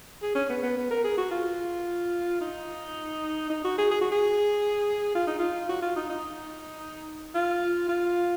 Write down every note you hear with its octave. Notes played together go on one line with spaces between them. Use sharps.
G#4
C#4
B3
B3
B3
A#4
G#4
F#4
F4
D#4
D#4
F#4
G#4
G#4
F#4
G#4
F4
D#4
F4
F#4
F4
D#4
D#4
F4
F4